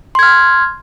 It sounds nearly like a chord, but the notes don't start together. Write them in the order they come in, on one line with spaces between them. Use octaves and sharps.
C6 G#6 F6